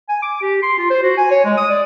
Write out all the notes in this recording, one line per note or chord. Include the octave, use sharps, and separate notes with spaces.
G#5
D6
G4
C6
F4
C5
F#4
G#5
C#5
G#3
D#6
D5